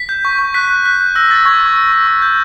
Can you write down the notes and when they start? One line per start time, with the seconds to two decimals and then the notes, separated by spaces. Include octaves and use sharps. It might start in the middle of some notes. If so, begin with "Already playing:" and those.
Already playing: B6
0.09 G6
0.25 C#6
0.39 C#6
0.54 F#6 B6
0.70 F#6
0.86 F#6
1.01 F#6
1.15 E6 A#6
1.30 E6 A6
1.45 C#6 G#6
1.60 C#6
1.76 E6
1.92 C#6
2.07 C#6
2.22 G6